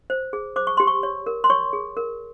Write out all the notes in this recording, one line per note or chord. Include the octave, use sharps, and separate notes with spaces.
C5
G#4
C5 D6
C#6
G4 C6
C#6
C#5
A#4
C6
C#5 C#6
G#4
A#4